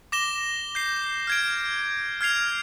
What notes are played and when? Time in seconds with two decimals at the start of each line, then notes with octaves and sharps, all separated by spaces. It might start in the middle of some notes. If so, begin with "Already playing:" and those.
0.12 D6 A#6 E7 G7
0.75 G6 C7
1.27 F6 G#6 D7
2.21 F6 G#6 C7 F7